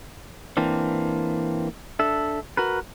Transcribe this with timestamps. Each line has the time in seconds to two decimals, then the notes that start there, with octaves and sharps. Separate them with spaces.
0.57 E3 A#3 C4 D4
1.99 D4 A4 E5
2.57 F#4 A#4 B4